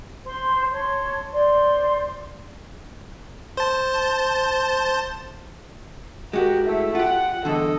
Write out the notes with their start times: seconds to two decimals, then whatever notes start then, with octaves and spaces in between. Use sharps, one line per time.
0.24 C5 C6
0.73 C#5 A5 C6
1.32 C5 D5 C6
3.57 C5 A5
6.33 G#3 F#4 G4 A#4
6.64 A3 E4
6.95 F4 G4 F#5
7.45 E2 G2 D3 A4 D#5